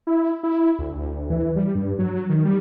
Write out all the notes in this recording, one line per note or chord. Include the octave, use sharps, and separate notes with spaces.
E4
E4
D2
D2
E3
G3
G2
F#3
D#3
G3